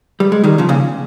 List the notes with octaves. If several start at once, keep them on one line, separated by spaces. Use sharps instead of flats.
G3
G#3
D#3 G3
C#3 F3
A#2 C#3